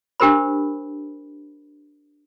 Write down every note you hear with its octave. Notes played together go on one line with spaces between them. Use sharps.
D4 G4 A#4 C5 B5